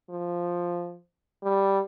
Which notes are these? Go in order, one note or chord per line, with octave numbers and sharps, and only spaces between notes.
F3
G3